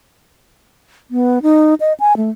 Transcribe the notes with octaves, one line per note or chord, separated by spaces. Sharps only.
B3
D#4
D#5
G#5
A3